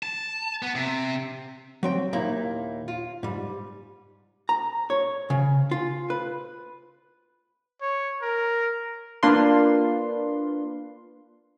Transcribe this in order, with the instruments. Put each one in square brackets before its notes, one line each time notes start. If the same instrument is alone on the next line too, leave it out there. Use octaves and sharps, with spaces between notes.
[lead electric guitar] A5
B3
C3
[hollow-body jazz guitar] F#3 C4 G5
D#2 A#2 A#3 D#4 E4 A#5
F4
G#2 G3
A#5
C#5
C#3
F4
B4
[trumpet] C#5
A#4
[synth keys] A#3 D4 F4 B4 C6